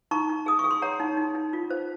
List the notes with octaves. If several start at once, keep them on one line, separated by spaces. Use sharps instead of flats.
D#4 A#5 C#6
D#4
G#4 D#6
C#6
G#4
C6
C#5 F#5 A#5
D#4
D#4
D#4
F4
C5